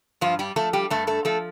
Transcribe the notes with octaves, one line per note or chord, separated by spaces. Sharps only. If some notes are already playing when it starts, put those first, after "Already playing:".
G2 F3 F4
G3 G4
F3 A3 A4
G3 G4
G2 A3 A4
A3 A4
F3 A3 A4